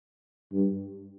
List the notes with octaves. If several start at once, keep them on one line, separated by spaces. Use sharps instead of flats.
G2